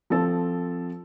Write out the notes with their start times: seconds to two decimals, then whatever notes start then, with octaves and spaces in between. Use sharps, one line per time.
0.10 F3 C4 A4